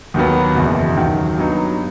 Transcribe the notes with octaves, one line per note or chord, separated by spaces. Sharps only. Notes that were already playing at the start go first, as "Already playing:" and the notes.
D#2 D#3 F#3 B3
F#1 E2 B2
D#2 D#3 F#3
G2 F#3 B3 D#4